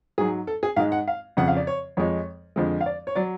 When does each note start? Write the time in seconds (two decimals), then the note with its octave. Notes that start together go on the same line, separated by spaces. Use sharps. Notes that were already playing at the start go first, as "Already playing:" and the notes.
0.18 G#2 F#3 G#4
0.47 A4
0.63 G#4
0.76 G#2 G#3 F5
0.92 F#5
1.08 F5
1.37 F2 C#3 F3 F#5
1.48 F5
1.56 D5
1.67 C#5
1.97 F2 F3 G#3 C#5
2.56 F2 D3 F3 G#3
2.81 F5
2.86 D5
3.07 C#5
3.15 F#3 D5